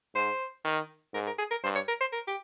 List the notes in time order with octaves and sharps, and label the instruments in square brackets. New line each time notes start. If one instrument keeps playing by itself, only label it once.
[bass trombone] G#2 [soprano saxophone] C5
[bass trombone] D#3
[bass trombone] G#2 [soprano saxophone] A#4
[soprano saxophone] A#4
G#4
A#4
[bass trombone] G2 [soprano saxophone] C5
[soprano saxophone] C#5
A#4
C5
A#4
G4